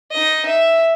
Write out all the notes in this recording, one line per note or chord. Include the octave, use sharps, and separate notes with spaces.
D#4 D#5
E5